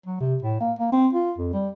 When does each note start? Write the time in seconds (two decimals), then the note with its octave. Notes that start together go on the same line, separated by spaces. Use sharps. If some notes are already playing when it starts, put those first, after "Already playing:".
0.06 F#3
0.20 C3
0.43 A2
0.61 A#3
0.79 A#3
0.93 C4
1.13 F4
1.38 F2
1.54 G3